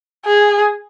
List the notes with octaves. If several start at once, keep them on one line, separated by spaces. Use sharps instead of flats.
G#4